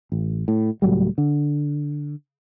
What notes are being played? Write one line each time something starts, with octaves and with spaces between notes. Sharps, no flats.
A1
A2
C#2 A2 F#3 G3
D3